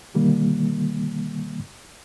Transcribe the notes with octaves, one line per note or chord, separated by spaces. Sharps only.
B2 D3 D#3 G3 A#3